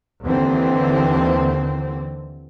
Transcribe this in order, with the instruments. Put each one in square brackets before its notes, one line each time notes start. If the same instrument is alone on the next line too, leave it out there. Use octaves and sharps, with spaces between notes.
[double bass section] D#2 D3 E3 C4